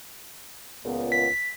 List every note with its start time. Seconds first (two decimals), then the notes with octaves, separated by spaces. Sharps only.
0.84 C#2 A#2 B3
1.12 B6